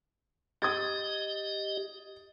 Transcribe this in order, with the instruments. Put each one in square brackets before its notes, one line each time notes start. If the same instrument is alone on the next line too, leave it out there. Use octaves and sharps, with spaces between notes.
[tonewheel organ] G4 D#5 [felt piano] D#6 G#6 A6